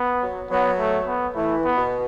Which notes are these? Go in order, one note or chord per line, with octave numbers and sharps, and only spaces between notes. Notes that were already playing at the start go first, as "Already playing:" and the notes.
Already playing: B3
F#3
F#3 B3
A3
B3
E3 A3
B3
B2